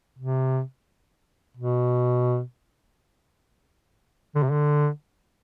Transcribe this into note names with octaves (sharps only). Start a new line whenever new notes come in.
C3
B2
D3
C3
D3